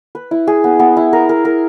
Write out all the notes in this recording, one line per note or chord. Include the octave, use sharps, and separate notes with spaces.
B4
E4
G#4
B3
B3
E4
A#4
A#4
A#4